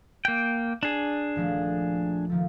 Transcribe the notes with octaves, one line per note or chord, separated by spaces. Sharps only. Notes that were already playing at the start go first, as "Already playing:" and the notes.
A#3 G5
D4 G#4
D#1 F3 A3
D#3 F3 A3